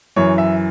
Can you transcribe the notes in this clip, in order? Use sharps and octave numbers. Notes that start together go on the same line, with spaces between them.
F#2 E3 C#5
E5